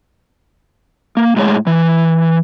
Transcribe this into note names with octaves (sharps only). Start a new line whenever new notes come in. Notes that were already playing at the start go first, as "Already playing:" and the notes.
A#3
A2 G#3 G#4 C#5
E3